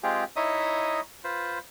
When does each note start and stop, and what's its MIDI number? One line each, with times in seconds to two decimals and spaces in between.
0.03 0.24 56
0.03 0.24 60
0.03 0.24 65
0.03 0.24 67
0.03 0.24 68
0.03 0.24 77
0.36 1.00 63
0.36 1.00 64
0.36 1.00 73
0.36 1.00 75
0.36 1.00 76
0.36 1.00 87
1.24 1.59 65
1.24 1.59 71
1.24 1.59 72